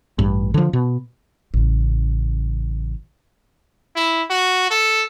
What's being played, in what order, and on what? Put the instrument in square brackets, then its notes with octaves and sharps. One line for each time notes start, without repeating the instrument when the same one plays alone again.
[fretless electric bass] A1 G2
D3 F3
B2
[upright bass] A1 C#3
[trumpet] E4
F#4
A4